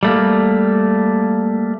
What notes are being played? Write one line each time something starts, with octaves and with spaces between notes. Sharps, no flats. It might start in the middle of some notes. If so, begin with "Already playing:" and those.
G3 A3 A#3